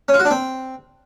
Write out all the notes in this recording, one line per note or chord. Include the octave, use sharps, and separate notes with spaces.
C#4
F4
F#4
D4
C4